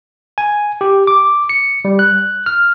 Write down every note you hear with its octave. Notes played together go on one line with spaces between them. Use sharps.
G#5
G4
D6
C#7
G3
F#6
F6